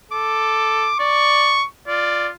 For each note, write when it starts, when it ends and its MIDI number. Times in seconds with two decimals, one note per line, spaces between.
0.12 0.93 69
0.12 0.99 86
0.99 1.59 74
0.99 1.67 85
1.88 2.30 65
1.88 2.30 74